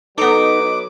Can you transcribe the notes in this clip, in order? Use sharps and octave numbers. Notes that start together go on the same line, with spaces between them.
F#3 B3 D#4 A4 B4 D6